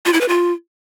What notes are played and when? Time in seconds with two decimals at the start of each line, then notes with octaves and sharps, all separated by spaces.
0.06 F4
0.13 E4
0.21 B4
0.28 F4